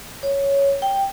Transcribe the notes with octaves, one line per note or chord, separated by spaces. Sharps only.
C#5
G5